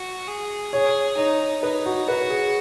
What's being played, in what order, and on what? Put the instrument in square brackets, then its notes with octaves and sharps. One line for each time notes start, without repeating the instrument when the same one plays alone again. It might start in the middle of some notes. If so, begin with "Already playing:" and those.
Already playing: [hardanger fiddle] F#4
G#4
[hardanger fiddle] G#4 [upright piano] C#5
[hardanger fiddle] D#4 [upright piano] C#5
[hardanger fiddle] D#4 [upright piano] B4
[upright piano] F#4
[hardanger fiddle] F#4 [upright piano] B4
[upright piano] G#4